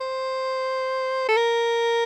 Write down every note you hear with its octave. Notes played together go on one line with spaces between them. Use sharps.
C5
A4
A#4